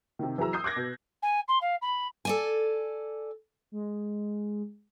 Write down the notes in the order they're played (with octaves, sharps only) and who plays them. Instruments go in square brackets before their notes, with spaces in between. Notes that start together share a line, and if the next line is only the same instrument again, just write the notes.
[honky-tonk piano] C3 D#3
E3 F#3 G#4 A#5 E6
D#6 G6 C7
D6 F#6 G#6 A#6
B2
[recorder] G#5
C6
F5
B5
[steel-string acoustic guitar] A4 D5 G#5
[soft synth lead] G#3